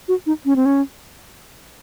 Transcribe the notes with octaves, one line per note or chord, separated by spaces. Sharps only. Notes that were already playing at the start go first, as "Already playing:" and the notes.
F#4
D#4
C#4
C4
C#4